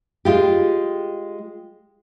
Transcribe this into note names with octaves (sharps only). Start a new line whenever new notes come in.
G#3 F4 G4